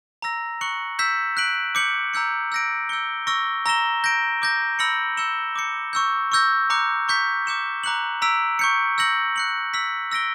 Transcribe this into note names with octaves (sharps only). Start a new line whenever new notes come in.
A#5 E6 A#6
C#6 F#6 C#7 F#7
E6 G6 B6 E7
F#6 B6 D7 F#7
D6 G6 C#7 F#7
A#5 E6 G6 C#7
E6 G6 A#6 D7
E6 G6 C#7 G7
C#6 E6 A#6 D7 G7
A#5 E6 A#6 E7 G7
G6 A#6 D7
D6 G6 A#6
B5 E6 A#6 C#7 F#7
E6 G6 C#7 E7 G7
D6 G6 C#7
C#6 E6 G6
C#6 E6 G6 A#6
A#5 D6 F#6 C#7
A#5 C#6 G6 B6
D6 G6 C#7 E7 G7
A#5 D6 F#6 C#7 F#7
A#5 E6 B6 D7
C#6 G6 C#7
E6 G6 A#6 C#7 F#7
F#6 C#7 F#7
E6 B6 F#7
E6 A#6 D7 G7